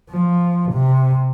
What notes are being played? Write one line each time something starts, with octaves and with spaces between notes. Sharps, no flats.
F3
C3